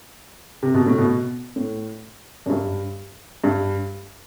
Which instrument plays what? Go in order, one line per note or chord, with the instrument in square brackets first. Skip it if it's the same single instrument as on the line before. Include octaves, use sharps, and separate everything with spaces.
[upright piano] C3
B2
A2
B2
A2
F#2
G2
G2